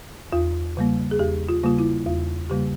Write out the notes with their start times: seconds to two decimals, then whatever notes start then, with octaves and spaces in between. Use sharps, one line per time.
0.32 E2 F4
0.77 C#3 G3 A#3
1.11 G#4
1.19 E2 G4
1.49 F4
1.63 C#3 G3 A#3 F4
1.78 E4
2.06 E2 F4
2.50 C#3 G3 A#3 G4